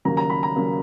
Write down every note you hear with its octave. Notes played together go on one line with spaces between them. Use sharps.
D#2 C#3 F#3 A#3 A#5
A#5
B5
A#5
C#3 F#3 A#3